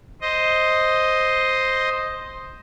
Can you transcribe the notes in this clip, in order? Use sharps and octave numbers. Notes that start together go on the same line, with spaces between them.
C5 D#5